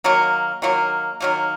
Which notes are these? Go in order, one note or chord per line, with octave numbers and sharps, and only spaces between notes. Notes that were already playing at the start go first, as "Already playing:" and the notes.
D#3 F#3 A#3
D#3 F#3 A#3
D#3 F#3 A#3